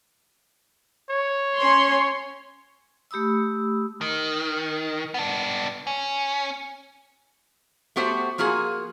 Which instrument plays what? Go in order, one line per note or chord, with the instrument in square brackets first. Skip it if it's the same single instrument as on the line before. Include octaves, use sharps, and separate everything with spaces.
[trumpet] C#5
[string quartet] C#4 [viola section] C6
[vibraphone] A3 G4 B5 D#6 E6
[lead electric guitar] D#3
B3 D4
C#4
[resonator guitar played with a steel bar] A3 B3 F#4 G4 C5
F3 A#3 F4 F#4 G#4